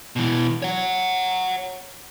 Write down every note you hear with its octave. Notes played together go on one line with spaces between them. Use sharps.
B2 E3
C#5 F#5